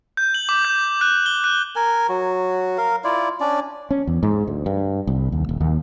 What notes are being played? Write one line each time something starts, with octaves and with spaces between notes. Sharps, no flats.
G6
F#7
D6
G6
F#6
G7
F#6
A#4 G#5
F#3 F#4
A#4 F5
E4 F4 D5
C#4 D4 D5
C#4
E2
G#2
D2
G2
C2
D#2
D#1
D#2